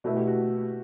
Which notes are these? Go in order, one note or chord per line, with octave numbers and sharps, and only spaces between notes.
B2 A3 E4 F#4 B4 E5
G4
F#4